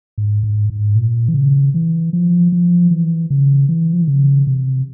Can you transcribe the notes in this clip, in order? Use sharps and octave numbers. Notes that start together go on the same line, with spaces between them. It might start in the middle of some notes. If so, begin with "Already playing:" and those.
G#2
G#2
G#2
A#2
E3
C#3
E3
F3
F3
E3
C#3
E3
F3
E3
C#3
C3